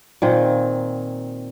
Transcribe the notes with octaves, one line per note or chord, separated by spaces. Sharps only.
A#2 D#3 C4